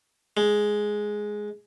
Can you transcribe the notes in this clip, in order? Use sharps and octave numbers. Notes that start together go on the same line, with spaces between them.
G#3